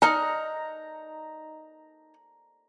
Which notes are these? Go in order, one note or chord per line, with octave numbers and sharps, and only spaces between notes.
D#4 A#5 F6 F#6